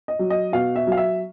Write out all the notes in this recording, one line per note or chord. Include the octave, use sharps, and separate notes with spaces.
D#5
F#3
D#5
B2 F5
E5
F#3 F5
E5